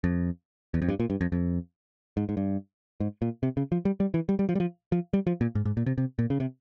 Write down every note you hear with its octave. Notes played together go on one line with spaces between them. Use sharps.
F2
E2
F2
G2
A#2
G2
F2
F2
G#2
G#2
G2
G#2
A#2
C3
C#3
F3
G3
G3
E3
G3
G3
F3
G3
F3
F3
G3
F3
A#2
G#2
G#2
A#2
C3
C3
A#2
C#3
C3